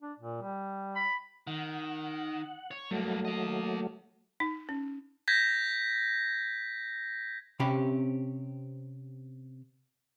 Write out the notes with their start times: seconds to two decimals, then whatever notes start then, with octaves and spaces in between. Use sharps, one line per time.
0.02 D4
0.19 A#2
0.42 G3
0.96 B5
1.47 D#3 F#5
2.71 C#5
2.91 G2 F#3 A3 A#3
3.25 A#3 D#5
4.40 D#4
4.69 C#4
5.28 G6 G#6 A#6 B6
7.60 C3 C4 C#4 G4 B5